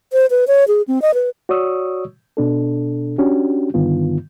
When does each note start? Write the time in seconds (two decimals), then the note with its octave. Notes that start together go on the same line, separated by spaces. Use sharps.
0.13 C5
0.30 B4
0.48 C#5
0.68 G#4
0.88 C4
1.02 D#5
1.14 B4
1.49 F#4 C#5 D5 C#6 D#6 E6
2.37 B2 D4 A4
3.18 C#4 D4 F#4 G4
3.74 G2 D3 D#3 B3 F4